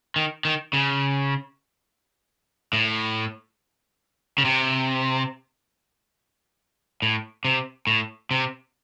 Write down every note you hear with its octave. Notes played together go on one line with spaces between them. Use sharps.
D#3
D#3
C#3
A2
C#3
C3
A2
C3
A2
C3